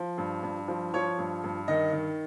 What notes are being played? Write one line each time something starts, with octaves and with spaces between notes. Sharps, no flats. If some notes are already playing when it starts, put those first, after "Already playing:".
Already playing: F3
G2
G2
F3
F3 C#5
G2
G2
D#3 D#5
D#3